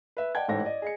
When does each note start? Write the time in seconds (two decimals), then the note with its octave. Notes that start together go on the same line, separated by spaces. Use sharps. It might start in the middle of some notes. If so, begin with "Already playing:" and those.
0.17 B4 E5
0.35 D5 D#5 F#5 G5 A5 G#6
0.48 A1 G#2 A4 C#5 G5 A#6
0.65 D5 D#5
0.82 G#4 D#5 C#7